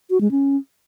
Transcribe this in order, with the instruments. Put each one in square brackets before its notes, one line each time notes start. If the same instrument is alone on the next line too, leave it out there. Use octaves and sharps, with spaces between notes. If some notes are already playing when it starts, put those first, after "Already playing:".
[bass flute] F#4
G#3
C#4